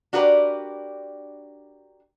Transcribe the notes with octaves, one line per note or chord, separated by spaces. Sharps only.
D4 F#4 G4 A#4 B4 D5